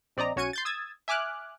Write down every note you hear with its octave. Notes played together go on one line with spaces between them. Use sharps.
A#1 C4 D5 D#5 A#5
B1 C#4 F#4 G#6 C#7 D#7
C6 G6 A6
D#6 E6 G#6 A6
E5 G#5 D6 F6 F#6